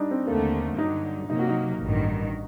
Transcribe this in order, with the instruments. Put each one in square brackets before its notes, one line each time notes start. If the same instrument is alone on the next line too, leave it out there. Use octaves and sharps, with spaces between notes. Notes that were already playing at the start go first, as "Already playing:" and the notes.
Already playing: [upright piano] G3 D4 D#4
C4
[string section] D#2 D3 A3 [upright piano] A#3
[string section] G2 D3 F#3 [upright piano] D#4
[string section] C3 F#3 A#3 [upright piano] D#4
[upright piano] F#4
D#4
[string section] A1 G2 D#3